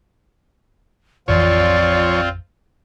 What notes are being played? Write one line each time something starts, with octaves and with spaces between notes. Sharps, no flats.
A1 F2 E3 F3 C4 F4 C#5 D5